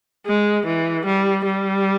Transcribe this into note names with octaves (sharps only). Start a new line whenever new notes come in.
G#3
E3
G3
G3